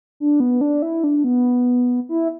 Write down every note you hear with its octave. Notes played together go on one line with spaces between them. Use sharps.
D4
B3
D4
E4
D4
B3
E4